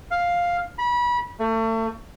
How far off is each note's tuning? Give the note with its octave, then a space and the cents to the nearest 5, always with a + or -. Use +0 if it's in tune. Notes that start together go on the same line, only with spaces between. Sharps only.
F5 +5
B5 -30
A3 +35